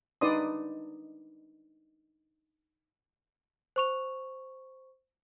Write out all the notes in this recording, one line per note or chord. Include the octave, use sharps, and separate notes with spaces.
D4 D#4 B4 D5 C6 D#6
C5 C#6 F7